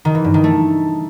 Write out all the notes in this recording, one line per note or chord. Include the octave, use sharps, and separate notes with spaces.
D#3
E3
G2
D#3
A3